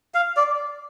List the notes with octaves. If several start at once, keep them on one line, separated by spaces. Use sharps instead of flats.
F5
D5